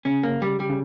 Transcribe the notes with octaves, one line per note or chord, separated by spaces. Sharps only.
C#3 C#4
A#3
G3
G3
C#3